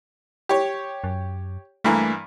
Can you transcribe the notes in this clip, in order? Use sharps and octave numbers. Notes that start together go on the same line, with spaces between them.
G4 C#5
F#2
G2 E3 A3 A#3